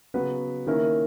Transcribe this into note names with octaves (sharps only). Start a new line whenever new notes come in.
C#3 F#3 B3 F#4 B4
D#3 A#3 C#4 E4 A#4